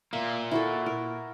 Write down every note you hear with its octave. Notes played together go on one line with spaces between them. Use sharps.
A#2 A#3 E5
E4 F#4 A4
A#4